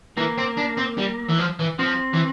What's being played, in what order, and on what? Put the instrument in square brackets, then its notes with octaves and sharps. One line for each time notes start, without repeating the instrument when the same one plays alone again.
[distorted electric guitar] E3 [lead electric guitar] A#3
[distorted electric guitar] C4
D4
C4
G3
E3
F3
E3
[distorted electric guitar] F3 [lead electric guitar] C4
[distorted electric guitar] E3